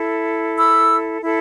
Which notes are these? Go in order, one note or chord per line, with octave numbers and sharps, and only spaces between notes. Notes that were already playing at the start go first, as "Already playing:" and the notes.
Already playing: E4 A4
B5 E6
E4 A4